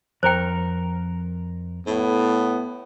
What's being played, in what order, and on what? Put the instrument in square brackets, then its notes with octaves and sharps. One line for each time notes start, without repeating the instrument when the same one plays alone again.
[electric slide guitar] F2 A#4 A#5 [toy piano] C5 G5
[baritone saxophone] A2 [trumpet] B3